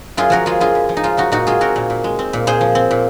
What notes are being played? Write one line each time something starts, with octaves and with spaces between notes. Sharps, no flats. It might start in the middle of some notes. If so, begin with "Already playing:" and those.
F#2 F4 G#4
F3 F#4 A#4
G#3 F4 G#4
F#2 F4 G#4
F#2
F3
D#4
G#3 F4
F#2 D#4 F#4
A#2 D#4 F#4
G#3 F4 G#4
C4 F#4 A#4
A#2
A#2
G#3
C4
A#2
A#2 G#4 C5
F3
C4
A#2